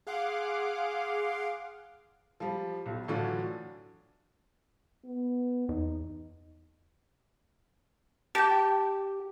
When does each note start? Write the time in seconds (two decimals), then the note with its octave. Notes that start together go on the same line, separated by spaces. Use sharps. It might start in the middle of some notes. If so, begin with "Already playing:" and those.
0.07 G#4 F5 F#5 C6 D6
2.40 F3 G3
2.86 B1
3.08 A2 D3 E3 F#3 D4 F4
5.04 B3
5.69 E2 D#4
8.35 G4 G5 A5